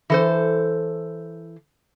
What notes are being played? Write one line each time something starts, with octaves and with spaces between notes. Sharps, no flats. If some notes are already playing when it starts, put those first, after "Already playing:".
E3 A4 C5